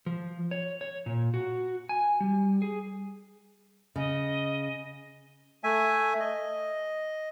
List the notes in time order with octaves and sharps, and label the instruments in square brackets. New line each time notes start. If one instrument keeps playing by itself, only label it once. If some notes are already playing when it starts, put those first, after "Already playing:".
[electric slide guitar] F3
C#5
C#5
A#2
F#4
G#5
G3
G#4
[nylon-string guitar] C#3 [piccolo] D#5
[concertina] A3 E5 G#5
D#5